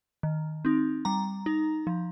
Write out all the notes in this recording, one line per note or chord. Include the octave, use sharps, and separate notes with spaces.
D#3
C4 D#4
G3 A#5
D#4
F3